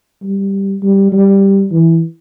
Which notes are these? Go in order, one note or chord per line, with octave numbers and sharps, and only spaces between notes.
G3
G3
G3
E3